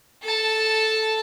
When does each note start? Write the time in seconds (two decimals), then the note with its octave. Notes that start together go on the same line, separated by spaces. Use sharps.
0.24 A4 A5